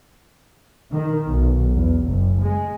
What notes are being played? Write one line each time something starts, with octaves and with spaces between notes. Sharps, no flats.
D#3
B1
E2
F#1
G#3